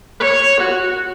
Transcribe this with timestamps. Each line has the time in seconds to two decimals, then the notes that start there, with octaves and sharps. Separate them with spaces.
0.20 C#5
0.60 F#4